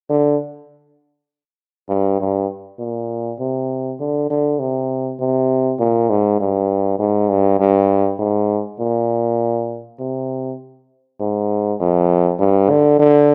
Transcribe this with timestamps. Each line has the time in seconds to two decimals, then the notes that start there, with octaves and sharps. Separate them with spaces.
0.10 D3
1.89 G2
2.20 G2
2.79 A#2
3.40 C3
4.00 D3
4.30 D3
4.60 C3
5.20 C3
5.79 A#2
6.10 G#2
6.40 G2
6.99 G#2
7.30 G2
7.60 G2
8.19 G#2
8.80 A#2
10.00 C3
11.20 G#2
11.80 F2
12.40 G2
12.70 D3
12.99 D3